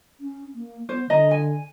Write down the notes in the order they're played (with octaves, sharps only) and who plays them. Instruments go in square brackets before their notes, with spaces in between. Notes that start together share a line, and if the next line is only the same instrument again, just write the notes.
[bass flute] C#4
A#3
[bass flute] B3 [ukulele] C5
[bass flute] D3 [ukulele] D#5 A#5
[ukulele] G#5